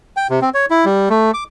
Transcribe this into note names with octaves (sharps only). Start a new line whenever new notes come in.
G5
C3
C4
C#5
E4
G3
A3
D6